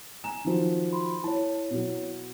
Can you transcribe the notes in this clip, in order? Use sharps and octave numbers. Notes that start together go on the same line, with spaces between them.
G#5 A#5 E7
D#3 F3 F#3
B5 C6
E4 C#5 A5
B2 F#3